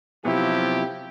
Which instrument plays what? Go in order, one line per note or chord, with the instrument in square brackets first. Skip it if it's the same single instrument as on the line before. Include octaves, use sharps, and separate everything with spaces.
[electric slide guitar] C3 F#3 B3 [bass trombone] F3 [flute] E4 [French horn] G4